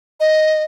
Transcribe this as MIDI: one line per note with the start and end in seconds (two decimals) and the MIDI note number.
0.20 0.64 75